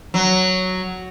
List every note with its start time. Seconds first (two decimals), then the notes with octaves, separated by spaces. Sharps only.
0.14 F#3